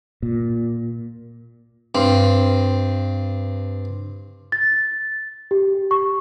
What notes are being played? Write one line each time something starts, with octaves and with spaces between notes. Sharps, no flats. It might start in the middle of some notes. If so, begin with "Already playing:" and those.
A#2
G2 C4
A6
G4
C#6